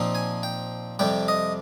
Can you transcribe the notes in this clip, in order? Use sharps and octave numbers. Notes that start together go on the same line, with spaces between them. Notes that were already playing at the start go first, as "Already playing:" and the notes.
Already playing: A#2 F3 C4 D#4
G#5
G5
F2 C3 G3 G5
D#5